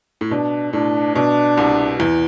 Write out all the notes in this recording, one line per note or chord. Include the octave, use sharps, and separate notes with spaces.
A2
B2 D4
A2 D4
B2 D4
C2 C3
E2 E3